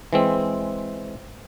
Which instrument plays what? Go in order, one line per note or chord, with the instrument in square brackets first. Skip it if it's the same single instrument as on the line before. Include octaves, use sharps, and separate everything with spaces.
[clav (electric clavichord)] E3 G#3 C4